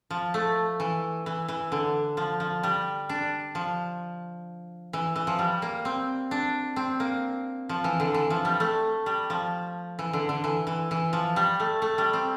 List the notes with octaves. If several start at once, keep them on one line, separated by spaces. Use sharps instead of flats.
F3
A3
E3
E3
E3
D3
F3
F3
G3
D4
F3
E3
E3
F3
G3
A#3
C4
D4
C4
A#3
F3
E3
D3
E3
F3
G3
A3
G3
F3
E3
D3
D3
E3
E3
E3
F3
G3
A3
A3
G3
C4